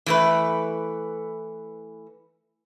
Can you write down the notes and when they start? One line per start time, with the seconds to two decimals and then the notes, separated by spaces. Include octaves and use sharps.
0.06 E3 A3 B4